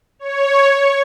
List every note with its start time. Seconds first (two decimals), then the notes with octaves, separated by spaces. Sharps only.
0.19 C#5
0.70 C#6